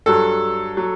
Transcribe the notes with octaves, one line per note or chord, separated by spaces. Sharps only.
G2 F#3 A4
F#3